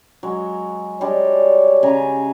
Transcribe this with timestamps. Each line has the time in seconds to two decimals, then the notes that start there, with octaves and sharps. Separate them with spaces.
0.23 F#3 G#3
1.01 G3 G#3 D4 C#5
1.83 C#3 G#5 A#5